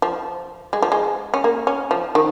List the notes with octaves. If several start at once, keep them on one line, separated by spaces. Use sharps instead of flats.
F3
G#3
F3
G#3
C#4
A#3
C#4
F3
D#3